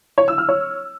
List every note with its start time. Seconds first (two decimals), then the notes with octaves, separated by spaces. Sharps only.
0.18 C#5
0.28 E6
0.38 F6
0.48 C#5